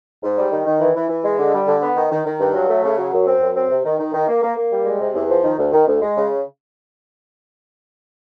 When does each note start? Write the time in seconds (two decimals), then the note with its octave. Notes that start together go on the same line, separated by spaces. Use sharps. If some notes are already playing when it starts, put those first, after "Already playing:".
0.23 G#2
0.37 G3
0.51 D#3
0.66 D#3
0.80 E3
0.95 E3
1.09 E3
1.24 G#3
1.38 D3
1.53 G3
1.67 D3
1.82 B3
1.96 D#3
2.11 D#3
2.25 D#3
2.40 G2
2.54 F#3
2.69 A3
2.83 C#3
2.98 F#3
3.12 F#2
3.27 C4
3.41 F#2
3.55 C4
3.70 C3
3.84 D#3
3.99 D#3
4.13 D#3
4.28 A#3
4.42 A#3
4.57 A#3
4.71 G3
4.86 G#3
5.00 C3
5.15 E2
5.29 F3
5.44 D#3
5.58 D2
5.72 D#3
5.87 D2
6.01 G#3
6.16 C#3